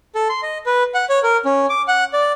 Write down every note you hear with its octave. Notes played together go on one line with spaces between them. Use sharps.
A4
C6
D#5
B4
F#5
C#5
A#4
C#4
D6
F#5
D5